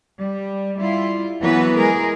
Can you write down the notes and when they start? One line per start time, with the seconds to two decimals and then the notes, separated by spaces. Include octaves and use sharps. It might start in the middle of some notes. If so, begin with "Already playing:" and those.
0.20 G3
0.77 G3 E4 F4
1.40 E3 F#3 B3 F#4 B4
1.75 G#3 G#4 A#4